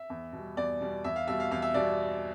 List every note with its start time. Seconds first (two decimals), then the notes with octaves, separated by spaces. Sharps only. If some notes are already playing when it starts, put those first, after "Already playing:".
Already playing: E5
0.10 E2
0.33 B2 G3
0.57 E2 D5
0.81 B2 G3
1.04 E2 E5
1.16 F5
1.27 B2 G3 E5
1.40 F5
1.51 E2 F5
1.62 E5
1.74 B2 G3 D5